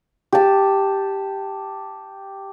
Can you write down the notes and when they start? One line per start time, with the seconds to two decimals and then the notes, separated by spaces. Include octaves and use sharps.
0.33 G4 A5